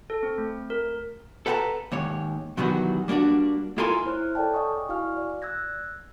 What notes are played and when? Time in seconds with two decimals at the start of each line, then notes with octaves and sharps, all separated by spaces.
0.10 A4
0.23 C4
0.38 A3
0.70 A#4
1.46 A4 B4 F5 F#5 A5 A#5
1.92 D#2 G#2 C#5
2.57 B2 D#3 E3 F#3 G3 F#4
3.08 G3 A#3 C#4 D4 F#4
3.78 E4 F4 A4 A#4 G#5 C6
4.06 E4 C5 C#5 E5 F6 F#6
4.35 G#4 A4 C#5 D5 G5 A5
4.54 D5 D#5 F#5 G#5 C#6 D#6
4.89 E4 F#4 F5 G#5 C#6 F6
5.17 D5
5.42 E6 F#6 G#6 A#6